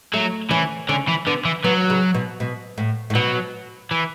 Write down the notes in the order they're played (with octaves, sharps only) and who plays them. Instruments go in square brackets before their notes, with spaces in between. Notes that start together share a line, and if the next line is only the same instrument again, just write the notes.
[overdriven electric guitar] F#3 [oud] A3
[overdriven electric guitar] E3 [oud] C#4
[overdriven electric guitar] D3 [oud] C#4
[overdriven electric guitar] E3
[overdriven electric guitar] D3 [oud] B3
[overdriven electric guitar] E3
[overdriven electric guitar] F#3 [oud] B3
[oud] C#3
B2
B2
A2
A2
[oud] B2 [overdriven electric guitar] F#3
[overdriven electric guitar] E3